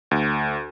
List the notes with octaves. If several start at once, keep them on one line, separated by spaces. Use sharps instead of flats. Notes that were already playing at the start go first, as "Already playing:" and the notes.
D2